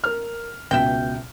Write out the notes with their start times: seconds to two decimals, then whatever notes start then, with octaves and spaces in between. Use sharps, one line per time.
0.04 A#4 F6
0.71 C#2 B2 E5 G5